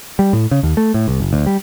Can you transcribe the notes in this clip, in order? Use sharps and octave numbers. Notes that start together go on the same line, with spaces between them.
G3
A2
C#3
D#2
A3
A2
C2
F#1
D2
G3